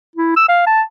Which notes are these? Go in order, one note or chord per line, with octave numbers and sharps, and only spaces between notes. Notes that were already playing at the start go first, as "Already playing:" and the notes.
E4
E6
F5
A5